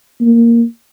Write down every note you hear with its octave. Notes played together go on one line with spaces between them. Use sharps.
A#3